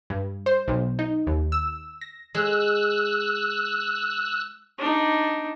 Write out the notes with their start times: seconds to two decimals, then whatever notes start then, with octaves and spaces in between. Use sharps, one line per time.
0.10 G2
0.46 C5
0.68 B1
0.99 D#4
1.27 D#2
1.52 E6
2.01 A#6
2.35 G#3 E6 F#6
4.78 D4 D#4